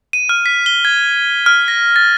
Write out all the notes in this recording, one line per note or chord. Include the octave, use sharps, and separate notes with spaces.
D#7
F6
B6
G7
G#6
F6
A#6
A6